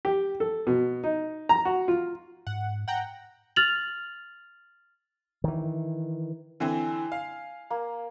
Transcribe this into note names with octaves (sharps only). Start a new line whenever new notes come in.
G4
A4
B2
D#4
A#5
F#4
F4
G#2 F#5
F#5 G5 A#5
F6 A6 F7 F#7
D#3 E3
D3 E3 C4 G#5
F5
A#3